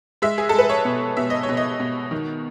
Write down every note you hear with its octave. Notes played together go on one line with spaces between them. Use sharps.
G#3 E5
G#4
G#3 A4
B4
C#5
B2
B2 E5
D#5
C#5
B2
D#5
B2
D#3